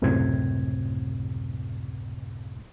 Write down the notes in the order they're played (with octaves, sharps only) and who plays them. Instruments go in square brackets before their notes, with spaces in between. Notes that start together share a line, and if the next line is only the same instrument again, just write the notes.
[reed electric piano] C#2 F#2 A2 C3 C4 G#6